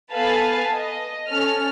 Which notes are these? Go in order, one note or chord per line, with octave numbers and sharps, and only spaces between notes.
B3 A4 B4 F5 G#5 A5
D#5
C#4 A4 F6